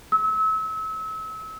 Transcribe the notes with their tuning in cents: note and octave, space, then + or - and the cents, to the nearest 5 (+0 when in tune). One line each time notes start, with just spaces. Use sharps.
E6 -35